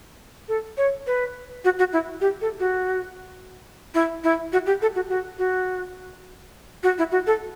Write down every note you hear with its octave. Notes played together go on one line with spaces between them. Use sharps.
A4
C#5
B4
F#4
F#4
E4
G4
A4
F#4
E4
E4
F#4
G4
A4
F#4
F#4
F#4
F#4
E4
F#4
A4